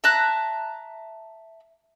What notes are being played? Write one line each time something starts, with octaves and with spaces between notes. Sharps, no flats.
E5 A5 A#5 F#6